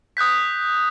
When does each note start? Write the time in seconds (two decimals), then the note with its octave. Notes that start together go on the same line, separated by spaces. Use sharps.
0.17 D#6 F#6 G6 B6